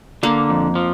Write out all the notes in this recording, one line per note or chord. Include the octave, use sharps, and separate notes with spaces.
D3 A#3
F2
F3